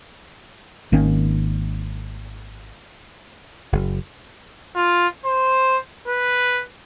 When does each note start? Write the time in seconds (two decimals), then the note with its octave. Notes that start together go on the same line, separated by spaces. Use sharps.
0.92 G#1 D#3 A#3 C#4
3.72 F#1
4.76 F4
5.25 C5
6.08 B4